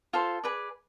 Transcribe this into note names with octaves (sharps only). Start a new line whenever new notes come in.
F4 A4 C5
G#4 B4 D5